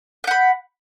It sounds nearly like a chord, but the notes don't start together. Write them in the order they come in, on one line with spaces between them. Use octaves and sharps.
G6 F#5 B5